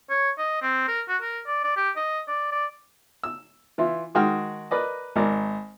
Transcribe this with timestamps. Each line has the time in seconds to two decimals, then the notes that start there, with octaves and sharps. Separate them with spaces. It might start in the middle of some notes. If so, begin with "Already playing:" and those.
0.10 C#5
0.38 D#5
0.62 C4
0.88 A#4
1.09 F#4
1.22 A#4
1.47 D5
1.64 D5
1.76 G4
1.96 D#5
2.28 D5
2.52 D5
3.24 E6
3.78 E3 E4 F4
4.15 D#3 G#3 F#4 G5 F6
4.71 A#4 B4 D5 D#5
5.16 G#1 A#4 D5